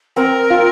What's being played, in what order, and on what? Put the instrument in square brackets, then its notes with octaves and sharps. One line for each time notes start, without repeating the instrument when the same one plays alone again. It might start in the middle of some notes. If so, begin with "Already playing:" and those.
[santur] C4 [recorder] A#4
[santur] F4